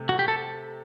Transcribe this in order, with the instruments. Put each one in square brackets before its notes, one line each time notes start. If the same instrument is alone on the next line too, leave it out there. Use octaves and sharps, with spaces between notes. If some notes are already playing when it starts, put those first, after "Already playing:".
Already playing: [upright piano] C3 A3
[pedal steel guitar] F#4
G4
A4